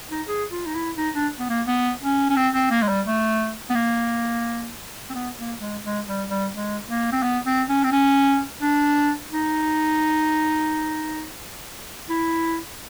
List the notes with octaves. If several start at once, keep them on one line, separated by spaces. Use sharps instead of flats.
D#4
G#4
F4
D#4
E4
D#4
D4
B3
A#3
B3
C#4
C#4
C4
C4
A#3
G#3
G3
A3
B3
A#3
C4
B3
A#3
G#3
G#3
G3
G3
G#3
A#3
C4
B3
C4
C#4
C4
C#4
D4
D#4
E4